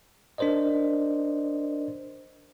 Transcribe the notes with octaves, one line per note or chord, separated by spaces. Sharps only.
D4 A#4 C5 D5 D#5